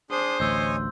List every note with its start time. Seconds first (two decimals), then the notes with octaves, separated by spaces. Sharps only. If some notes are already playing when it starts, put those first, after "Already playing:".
0.11 D4 G#4 C5 D#6
0.40 A1 D2 C#5 D#5 G#5 C6 E6 G6